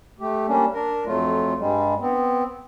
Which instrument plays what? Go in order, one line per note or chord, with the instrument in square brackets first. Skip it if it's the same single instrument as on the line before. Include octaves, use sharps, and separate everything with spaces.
[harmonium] A3 G4
G3 A#3 C#4 D4
D4 A#4
F2 F#3 A3 F4
G2 G3 G#3
B3 C4